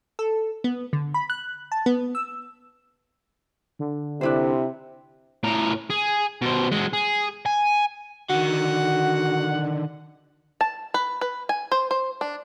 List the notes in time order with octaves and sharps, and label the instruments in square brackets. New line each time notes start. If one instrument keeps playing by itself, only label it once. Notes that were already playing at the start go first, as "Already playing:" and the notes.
[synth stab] A4
B3
D3
B5
F#6
A5
B3
E6
[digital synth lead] D3
[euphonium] C3 [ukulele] D4 E4 C5
[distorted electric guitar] A2 A#4
G#4
B2 C5
G#3 F#4
G#4
G#5
[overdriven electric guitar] D3 D#3 [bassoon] F#4 [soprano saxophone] F#5
[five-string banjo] A5
B4
B4
G#5
C5
C5
D4